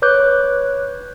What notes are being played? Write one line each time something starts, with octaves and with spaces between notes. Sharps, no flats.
B4 C#5 D6 F#6 G6